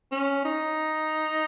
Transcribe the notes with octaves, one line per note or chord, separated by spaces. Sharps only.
C#4
D#4